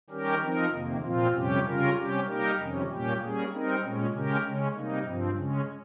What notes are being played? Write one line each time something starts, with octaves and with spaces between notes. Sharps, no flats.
D#3 G3 C#4 G4 A#4
F3 C4 D#4 A#4
F2 C3 D#3 A#3
A#2 F3 C4 F4
F2 C3 G3 C#4 G4
C#3 G3 C#4 F4 A#4
C3 G3 C#4 G4
G3 A#3 D#4 G4 A#4
F2 C3 D#3 G3 C#4
A#2 G3 A#3 C#4 G4
G3 A#3 C#4 G#4
G3 C4 D#4 A#4
A#2 G#3 C#4
C#3 G#3 C#4 G4 A#4
C#3 G#3 C#4
C3 G3 A#3 D#4
G2 F3 C4
C#3 G#3 C#4